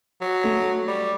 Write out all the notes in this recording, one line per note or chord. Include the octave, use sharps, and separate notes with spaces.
F#3
A3
G3